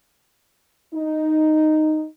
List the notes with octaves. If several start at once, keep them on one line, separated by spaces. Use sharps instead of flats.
D#4